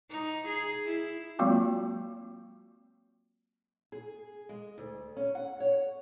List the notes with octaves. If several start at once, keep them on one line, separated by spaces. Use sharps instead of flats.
D#4
G#4
E4
F#3 G#3 A#3 C4 F4 F#4
G#4
G#3
D2
C#4
F#5
C#5